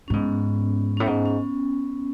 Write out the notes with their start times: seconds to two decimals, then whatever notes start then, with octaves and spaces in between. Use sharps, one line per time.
0.08 A2 C#4
0.13 G#2 B3
0.97 A2 C#4
1.06 G#2 B3
1.26 C#4